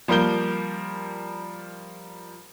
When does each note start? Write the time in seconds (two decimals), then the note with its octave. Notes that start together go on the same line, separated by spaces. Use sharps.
0.08 F3 G3 A#3 A#4 G6 G7